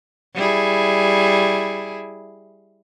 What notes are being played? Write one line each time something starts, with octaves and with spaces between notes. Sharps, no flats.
G3 E4 G#4